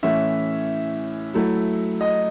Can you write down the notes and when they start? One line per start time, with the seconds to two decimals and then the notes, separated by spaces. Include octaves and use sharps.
0.03 A2 E3 A3 C#4 E5
1.34 F#3 A3 E4
2.01 D#5